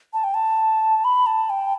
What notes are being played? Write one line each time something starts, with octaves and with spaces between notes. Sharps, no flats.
A5
G5
A5
B5
A5
G5